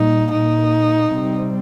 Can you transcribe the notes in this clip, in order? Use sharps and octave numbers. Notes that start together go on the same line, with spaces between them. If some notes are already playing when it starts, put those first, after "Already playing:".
Already playing: A#2 G3 A#3 D#4
A#2 A#3 D#4
C3 G3 C4